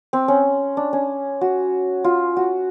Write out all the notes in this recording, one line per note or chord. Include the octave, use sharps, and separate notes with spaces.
C4
C#4
D4
C#4
F#4
F4
F#4